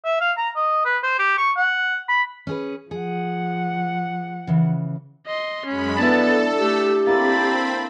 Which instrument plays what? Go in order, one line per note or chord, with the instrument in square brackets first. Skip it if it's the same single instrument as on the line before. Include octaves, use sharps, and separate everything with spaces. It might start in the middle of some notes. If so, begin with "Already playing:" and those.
[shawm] E5
F5
A#5
D#5
B4
C5
G4
C#6
F#5
B5
[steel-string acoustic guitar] C#4 G#4 B4
[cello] F3 F#5 [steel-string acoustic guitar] G#4
[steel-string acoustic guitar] C#3 E3
[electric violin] D#5 C6
[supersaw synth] F#2 G#3 B5 [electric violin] C#4
[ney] B3 [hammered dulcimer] D4 E4 [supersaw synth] A4 [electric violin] A5 A6
[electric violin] A3 E6 [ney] G4
[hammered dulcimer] A#3 E4 A4 [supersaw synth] C4 B5 [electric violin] A6